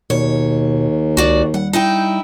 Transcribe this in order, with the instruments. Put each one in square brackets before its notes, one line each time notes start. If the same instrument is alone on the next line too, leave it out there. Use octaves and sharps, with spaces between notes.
[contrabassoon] D#2 [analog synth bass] B2 [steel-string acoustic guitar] C#5
[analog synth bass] C#2 [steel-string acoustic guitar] F#4 D5
[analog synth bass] G3 [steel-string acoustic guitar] F#5
[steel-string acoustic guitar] D#4 E4 G5